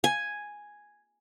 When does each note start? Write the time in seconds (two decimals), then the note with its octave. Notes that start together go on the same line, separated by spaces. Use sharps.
0.04 G#5